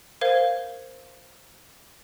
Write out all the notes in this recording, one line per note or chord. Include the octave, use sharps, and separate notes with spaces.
A#4 C5 F5 G#6